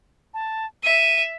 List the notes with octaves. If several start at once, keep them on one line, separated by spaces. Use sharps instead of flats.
A5
E5 D#7